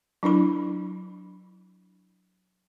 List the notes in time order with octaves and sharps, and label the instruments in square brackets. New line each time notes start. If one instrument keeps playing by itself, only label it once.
[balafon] F#3 D4 E4 B5